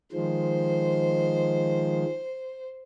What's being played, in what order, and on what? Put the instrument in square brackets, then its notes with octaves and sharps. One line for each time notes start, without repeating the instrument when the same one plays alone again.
[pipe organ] D#3 F3 G#3 [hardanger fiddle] C5